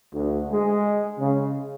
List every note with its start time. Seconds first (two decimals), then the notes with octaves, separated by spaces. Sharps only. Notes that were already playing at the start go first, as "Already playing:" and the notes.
0.13 D2
0.49 G#3
1.19 C#3